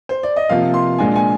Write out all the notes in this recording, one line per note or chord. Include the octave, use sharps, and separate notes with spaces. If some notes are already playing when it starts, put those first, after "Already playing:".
C5
D5
D#5
C3 F3 A#3 F4 F5
C6
A#2 G#3 D4 F4 G#5
G#5